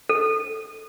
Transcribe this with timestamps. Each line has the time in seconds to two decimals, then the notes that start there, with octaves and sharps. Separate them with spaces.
0.09 A4